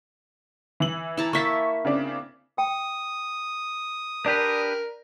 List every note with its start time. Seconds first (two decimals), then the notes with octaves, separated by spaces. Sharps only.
0.80 E3 F#7
1.17 E4 A5 A#5
1.33 A#3 E5 A5 C#6 B6
1.85 C#3 C4 D4
2.58 G5 D#6
4.26 D4 G4 A#4 B4 D5